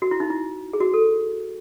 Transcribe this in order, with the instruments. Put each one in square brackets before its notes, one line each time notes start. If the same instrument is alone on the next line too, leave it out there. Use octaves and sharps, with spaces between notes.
[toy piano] F#4
E4
D#4
E4
G#4
F#4
A4